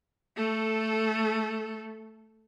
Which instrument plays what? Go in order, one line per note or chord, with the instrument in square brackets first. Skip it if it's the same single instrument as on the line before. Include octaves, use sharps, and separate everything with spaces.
[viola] A3 A4